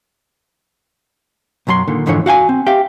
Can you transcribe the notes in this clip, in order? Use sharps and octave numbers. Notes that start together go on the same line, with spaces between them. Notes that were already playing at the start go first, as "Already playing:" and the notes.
B1 F#2 F#3 A#5 C6
A#2 D3 D#3
F2 G#2 D3 E3 F3 C#5
F#4 F5 G5 G#5
C4
G4 E5 F5 G5